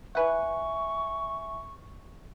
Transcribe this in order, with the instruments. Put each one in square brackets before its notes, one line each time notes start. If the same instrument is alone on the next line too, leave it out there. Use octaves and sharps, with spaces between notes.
[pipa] E4 B4 F#5 [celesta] E5 G#5 [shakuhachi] C#6